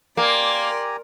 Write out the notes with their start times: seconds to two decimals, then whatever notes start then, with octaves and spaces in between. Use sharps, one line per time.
0.17 A#3 G4 D5 G#5 A#5 C6